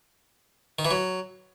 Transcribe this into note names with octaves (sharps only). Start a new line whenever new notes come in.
D#3
E3
F#3